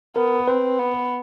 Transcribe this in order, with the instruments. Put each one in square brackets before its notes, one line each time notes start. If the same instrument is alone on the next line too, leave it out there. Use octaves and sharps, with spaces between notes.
[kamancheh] B3 [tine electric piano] A#4
[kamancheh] C4 [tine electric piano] B4
[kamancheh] B3